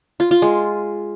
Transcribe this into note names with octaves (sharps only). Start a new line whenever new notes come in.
F4
F4
G#3